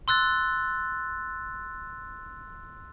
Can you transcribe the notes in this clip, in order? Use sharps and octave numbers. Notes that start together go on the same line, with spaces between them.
C6 E6 F#6 A6